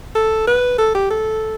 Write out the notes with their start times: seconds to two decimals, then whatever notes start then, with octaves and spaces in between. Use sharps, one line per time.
0.15 A4
0.47 B4
0.78 A4
0.95 G4
1.10 A4